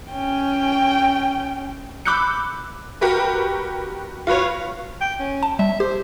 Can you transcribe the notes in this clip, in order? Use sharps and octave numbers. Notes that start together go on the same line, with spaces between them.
C#4 G5
B5 D6 E6 F#6 G6 C#7
F#4 G4 A#4 B4
F4 F#4 B4 C#5
G5
C#4
A5
G3 E5
G4 C5